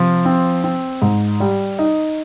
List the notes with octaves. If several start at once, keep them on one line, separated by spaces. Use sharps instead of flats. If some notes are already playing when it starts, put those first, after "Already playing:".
Already playing: C3 F3
C4
C4
G#2
G3
D#4